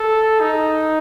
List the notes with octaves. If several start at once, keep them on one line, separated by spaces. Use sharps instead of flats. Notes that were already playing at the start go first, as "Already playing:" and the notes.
Already playing: A4
D#4